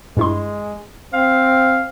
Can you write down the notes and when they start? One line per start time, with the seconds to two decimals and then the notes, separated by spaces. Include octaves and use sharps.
0.17 G2 G#3 E4 C6
1.13 C4 F5